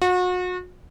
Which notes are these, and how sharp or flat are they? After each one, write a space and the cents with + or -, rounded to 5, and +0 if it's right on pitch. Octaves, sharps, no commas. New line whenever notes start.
F#4 -35